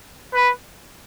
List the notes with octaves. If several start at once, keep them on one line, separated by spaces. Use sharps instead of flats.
B4